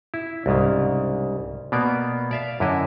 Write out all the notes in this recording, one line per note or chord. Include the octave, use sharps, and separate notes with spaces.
E4
C2 G#2 C#3
B2 A#3 B3 D5
D5 E5 F5
F#2 D3 E4 D#5